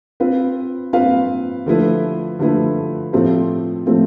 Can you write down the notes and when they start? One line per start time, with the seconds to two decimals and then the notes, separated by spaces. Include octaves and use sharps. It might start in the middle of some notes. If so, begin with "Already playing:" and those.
0.20 C4 F4 B4 F5
0.93 C4 F4 B4 F5
1.66 D3 F3 A3 E4 B4
2.39 D3 F3 A3 E4 B4
3.13 A2 F3 A3 C4 F4
3.86 A2 F3 A3 C4 F4